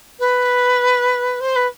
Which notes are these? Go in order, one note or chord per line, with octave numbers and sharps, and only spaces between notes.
B4
C5
B4